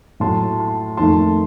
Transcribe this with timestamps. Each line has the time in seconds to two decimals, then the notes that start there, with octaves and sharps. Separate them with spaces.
0.20 A2 F#3 A3 A5 C6
0.58 A5 C6
0.97 F2 D#3 A3 A5 C6